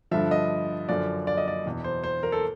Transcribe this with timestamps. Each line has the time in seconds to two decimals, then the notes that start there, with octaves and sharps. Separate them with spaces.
0.11 G2 D3 F3 E5
0.31 D#5
0.89 F#2 D3 F3 D5
1.27 D5
1.37 D#5
1.48 D5
1.66 E2 B2
1.84 C5
2.04 C5
2.23 A#4
2.32 A4